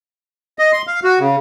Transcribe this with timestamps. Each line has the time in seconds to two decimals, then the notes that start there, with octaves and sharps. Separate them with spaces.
0.59 D#5
0.72 C6
0.87 F5
1.04 F#4
1.19 C#3